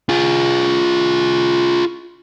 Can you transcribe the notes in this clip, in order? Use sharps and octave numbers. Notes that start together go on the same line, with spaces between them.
F4 G#4